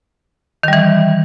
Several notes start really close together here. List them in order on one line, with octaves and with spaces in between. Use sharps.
D#3 G3 E3